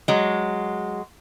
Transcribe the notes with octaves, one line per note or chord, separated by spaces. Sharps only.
F#3 G#3